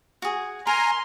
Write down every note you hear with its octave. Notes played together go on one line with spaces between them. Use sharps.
F#4 G#4
A#4 G#5 A#5 C6